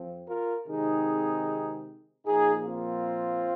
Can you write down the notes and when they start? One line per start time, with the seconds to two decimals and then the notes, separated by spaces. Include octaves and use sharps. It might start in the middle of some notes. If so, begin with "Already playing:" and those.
Already playing: F2 F3 C4
0.29 F4 A#4
0.68 C3 D#3 G#3 C4 D#4 G#4
2.26 A#2 F3 A#3 D#4 G#4
2.66 C4 F4